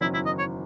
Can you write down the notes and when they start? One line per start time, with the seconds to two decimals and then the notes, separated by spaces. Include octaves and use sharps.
0.01 F#1 E2 D#3 F#3 C#4 E4
0.14 E4
0.26 D#5
0.39 C#5